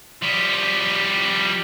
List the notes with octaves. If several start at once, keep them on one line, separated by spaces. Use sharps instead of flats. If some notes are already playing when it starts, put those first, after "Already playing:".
F3 G3